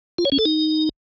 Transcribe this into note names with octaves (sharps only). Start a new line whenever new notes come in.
F4
C#5
C#4
A4
D#4